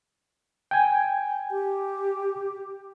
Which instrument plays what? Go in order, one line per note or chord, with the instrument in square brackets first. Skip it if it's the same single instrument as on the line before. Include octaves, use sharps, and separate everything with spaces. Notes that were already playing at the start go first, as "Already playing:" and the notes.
[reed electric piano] G5 G#5
[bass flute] G4